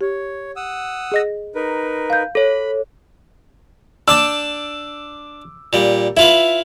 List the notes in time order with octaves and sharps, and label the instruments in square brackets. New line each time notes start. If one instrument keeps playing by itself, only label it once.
[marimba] G4 [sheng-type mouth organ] C#5
[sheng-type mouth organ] F#5 D#6 E6
[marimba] G#4 D#5 A#6
[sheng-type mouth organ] D#4 A#4 B4
[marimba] F5 G6
[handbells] A4 C#5 [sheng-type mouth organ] B5
[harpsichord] D4 G5 A5 [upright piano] D6 E6
[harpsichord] A#2 G3
[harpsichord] E4 F4 B4 [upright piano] E5